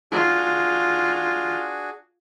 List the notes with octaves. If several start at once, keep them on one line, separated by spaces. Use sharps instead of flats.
D4 F4 F#4 G#4